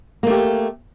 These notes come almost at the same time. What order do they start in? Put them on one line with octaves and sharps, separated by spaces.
A#3 A3 G4